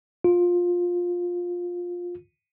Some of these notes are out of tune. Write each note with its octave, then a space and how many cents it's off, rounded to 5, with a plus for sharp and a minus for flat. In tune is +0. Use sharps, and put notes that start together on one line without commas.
F4 +15